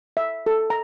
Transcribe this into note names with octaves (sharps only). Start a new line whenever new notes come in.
E5
A4
A#5